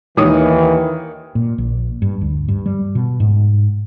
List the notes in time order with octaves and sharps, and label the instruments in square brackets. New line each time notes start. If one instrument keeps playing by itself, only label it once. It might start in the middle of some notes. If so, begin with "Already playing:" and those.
[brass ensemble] D#2 E3 [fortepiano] D#3 C#5 D#6
[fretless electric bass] A#2
A#1
G2
D2
G2
G3
B2
G#2